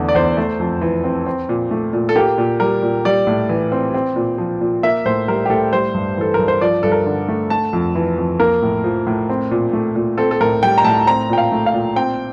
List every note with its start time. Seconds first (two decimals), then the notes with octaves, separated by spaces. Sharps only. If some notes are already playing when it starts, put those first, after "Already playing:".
Already playing: E2 D3 A3
0.09 D5
0.15 E2 C5
0.37 A3
0.60 F2
0.81 E3
1.04 C4
1.26 C4
1.49 A#2
1.71 A3
1.93 A#2
2.09 A4
2.16 A#3 G4
2.38 A#2
2.60 G3 A#4
2.83 A#2
3.05 G3 D5
3.27 A2
3.49 E3
3.72 C4
3.94 C4
4.16 A#2
4.38 F3
4.61 A#2
4.83 A#3 E5
5.05 A2 C5
5.28 G3 A#4
5.46 G4
5.50 A2 A4
5.73 G3 C5
5.94 G2
6.17 E3 A4
6.34 G2 A#4
6.48 C5
6.61 F3 D5
6.83 G2 A4
6.92 A#4
7.06 D3
7.28 A3
7.50 A3 A5
7.73 F2
7.95 E3
8.18 F2
8.40 A#3 A#4
8.62 A2
8.84 F3
9.07 A2
9.29 C4
9.51 A#2
9.73 A3
9.96 A#2
10.18 C4 A4
10.31 A4
10.41 A2 A#4
10.63 G3 G5
10.78 A#5
10.84 A2 A5
11.07 C4 A#5
11.30 A#2 G5
11.38 F5
11.52 A3
11.66 F5
11.74 A#2
11.96 C4 G5